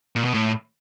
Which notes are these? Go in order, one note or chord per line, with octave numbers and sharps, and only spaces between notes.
A#2
B2
A2